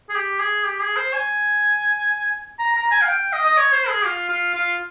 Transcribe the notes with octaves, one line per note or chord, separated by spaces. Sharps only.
G#4
G4
G#4
G4
G#4
C5
G#5
A#5
A#5
G#5
F5
G5
D#5
D#5
C#5
C5
G#4
F4
F4
F4